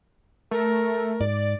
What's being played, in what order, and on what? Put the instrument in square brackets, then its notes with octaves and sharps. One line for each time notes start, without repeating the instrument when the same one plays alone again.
[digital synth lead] A3 [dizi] A#4
[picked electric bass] G#2 [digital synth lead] D5